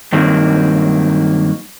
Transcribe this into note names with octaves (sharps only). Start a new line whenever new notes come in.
G2 D#3 F#3 A#3 C4